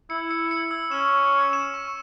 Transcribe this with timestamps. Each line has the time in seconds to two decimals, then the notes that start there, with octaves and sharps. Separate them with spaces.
0.10 E4 C#7
0.31 C#7
0.51 C#7
0.71 E6
0.91 C#4 E7
1.12 E6
1.32 E6
1.53 E7
1.74 C#6